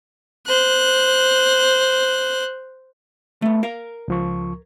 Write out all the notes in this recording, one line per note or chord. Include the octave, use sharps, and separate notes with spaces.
C5 F#6
A3 B3
A#4 F5
C#2 F3 C#6